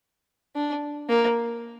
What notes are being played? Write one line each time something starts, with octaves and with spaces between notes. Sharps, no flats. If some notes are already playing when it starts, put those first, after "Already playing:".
D4
A#3